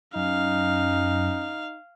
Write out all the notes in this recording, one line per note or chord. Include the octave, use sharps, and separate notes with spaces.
F#2 C#4 D#4 F5